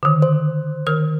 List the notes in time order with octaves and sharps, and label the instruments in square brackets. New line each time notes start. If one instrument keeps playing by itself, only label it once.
[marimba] D3 D#3
[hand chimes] C5
[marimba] D#3 A#4 F6